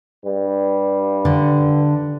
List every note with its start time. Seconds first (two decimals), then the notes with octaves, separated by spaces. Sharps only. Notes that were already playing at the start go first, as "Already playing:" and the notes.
0.25 G2 G3
1.25 D3